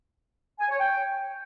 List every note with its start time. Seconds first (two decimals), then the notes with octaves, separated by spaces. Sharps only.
0.60 G#5
0.69 C#5
0.78 G5